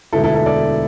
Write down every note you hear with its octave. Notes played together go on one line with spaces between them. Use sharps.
E1 D2 D3 B3 E4 A4
E4 A4
E4 A4
A4 D5